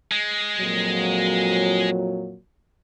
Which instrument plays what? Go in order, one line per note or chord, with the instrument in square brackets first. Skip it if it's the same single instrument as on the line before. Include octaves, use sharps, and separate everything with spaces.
[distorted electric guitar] G#3
[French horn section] F2 A#2 F#3